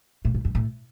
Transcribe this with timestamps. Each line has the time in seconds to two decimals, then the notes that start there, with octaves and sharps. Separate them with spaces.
0.25 A2
0.34 G#2
0.45 F#2
0.55 A2